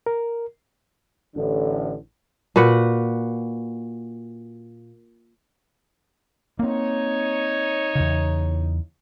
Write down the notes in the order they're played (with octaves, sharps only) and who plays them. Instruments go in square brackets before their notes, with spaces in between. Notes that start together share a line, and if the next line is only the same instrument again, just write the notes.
[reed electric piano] A#4
[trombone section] A1 D3
[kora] A#2 F#4 B4 F#5
[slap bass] A#3 C4 [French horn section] D#4 C#5
[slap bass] E2 C#3